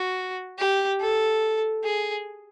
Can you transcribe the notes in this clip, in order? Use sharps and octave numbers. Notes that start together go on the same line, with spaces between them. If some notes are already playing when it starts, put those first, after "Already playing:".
Already playing: F#4
G4
A4
G#4